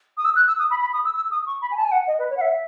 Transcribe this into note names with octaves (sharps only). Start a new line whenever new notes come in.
D#6
E6
F#6
E6
D#6
B5
B5
D#6
E6
E6
D#6
C#6
B5
G#5
A5
G#5
F#5
D#5
B4
C#5
F#5
E5